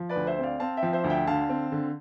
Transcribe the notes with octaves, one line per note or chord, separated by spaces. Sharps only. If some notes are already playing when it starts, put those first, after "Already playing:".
Already playing: F3
B4 D5
D2
C5 E5
C4 D5 F5
C4 F5 A5
E5 G5
F3
C5 E5
D2
E5 G5
D3 F5 A5
C4
D3